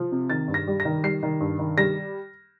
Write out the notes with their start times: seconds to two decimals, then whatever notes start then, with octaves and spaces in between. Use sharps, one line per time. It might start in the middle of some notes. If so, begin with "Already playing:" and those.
Already playing: F3
0.12 C3
0.30 D#3 A6
0.48 G2
0.54 A#6
0.68 G3
0.80 A#6
0.85 D#3
1.03 G3 C7
1.23 D#3
1.41 G2
1.59 D#3
1.77 G3 A#6